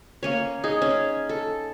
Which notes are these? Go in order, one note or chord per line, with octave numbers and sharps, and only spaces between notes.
A#3 C#4 C#5
D#4 G#4
C#4
A4